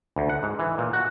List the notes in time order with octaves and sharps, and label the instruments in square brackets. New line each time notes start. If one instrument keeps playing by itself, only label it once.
[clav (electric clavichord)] D2
F#5
G#2
E3
A#2
F#4